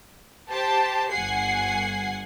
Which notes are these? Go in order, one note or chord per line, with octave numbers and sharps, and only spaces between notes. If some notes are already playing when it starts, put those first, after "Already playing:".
G4 C5 A5
G1 F#5 G#5 C7